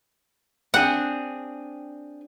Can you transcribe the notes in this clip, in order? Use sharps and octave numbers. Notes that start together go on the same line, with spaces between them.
C4 D4 G#4 F#5